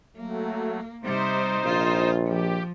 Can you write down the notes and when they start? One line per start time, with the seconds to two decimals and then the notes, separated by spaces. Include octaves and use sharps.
0.17 F#3 A3 A#3
1.04 C3 G3 D#4 C5
1.64 A#1 F4
2.25 F3 G4